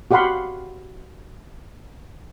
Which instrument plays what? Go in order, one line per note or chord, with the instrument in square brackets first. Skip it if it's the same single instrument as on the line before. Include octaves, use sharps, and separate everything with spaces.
[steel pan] F#4 G4 F5 F#5 B5 C6